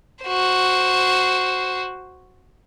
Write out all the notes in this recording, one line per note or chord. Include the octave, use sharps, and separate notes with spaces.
F#4 C5